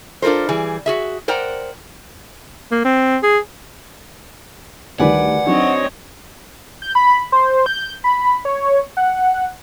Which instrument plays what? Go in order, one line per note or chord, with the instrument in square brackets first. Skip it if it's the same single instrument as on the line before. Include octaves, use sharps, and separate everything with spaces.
[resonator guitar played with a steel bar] D4 F4 A4 A#4 C5
E3 G3 G#4
F#4 G#4 E5
A#4 C5 D5 F#5 G5 A#5
[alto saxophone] A#3
C4
G#4
[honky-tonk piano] D2 D#3 G3 [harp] B4 D5 G#5 [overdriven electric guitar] F#5
[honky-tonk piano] F#3 D4 D#4 [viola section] C4 C#5 D#5
[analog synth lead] G6
B5
C5
G6
B5
C#5
F#5